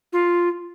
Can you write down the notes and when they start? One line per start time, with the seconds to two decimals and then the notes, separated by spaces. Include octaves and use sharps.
0.13 F4